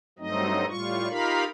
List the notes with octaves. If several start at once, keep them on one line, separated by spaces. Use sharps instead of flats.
G2 F#3 A3 C4 D#4 D#5
A2 G3 F4 C#6
D#4 F4 G4 A#4 F5 B5